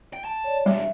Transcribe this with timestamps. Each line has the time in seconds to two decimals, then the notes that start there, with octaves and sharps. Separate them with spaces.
0.13 G5
0.25 A5
0.44 C#5 D5
0.66 G3 G#3 D4 E5